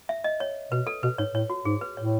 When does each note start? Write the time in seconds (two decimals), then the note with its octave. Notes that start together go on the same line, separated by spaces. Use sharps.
0.09 E5
0.24 D#5
0.40 C#5
0.71 B2 B4
0.87 A4
1.03 B2 B4
1.18 G#2 C#5
1.34 A2 C#5
1.50 F#4
1.65 G#2 G#4
1.81 B4
1.97 A2 C#5